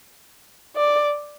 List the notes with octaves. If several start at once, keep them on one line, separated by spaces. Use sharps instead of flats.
D5